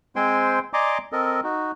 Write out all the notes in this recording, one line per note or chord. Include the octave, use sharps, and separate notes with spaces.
G#3 C4 C5 G5 G#5 C6
D5 D#5 G#5 A#5 C6 D6
C4 A4 A#4 D#5
D#4 F#4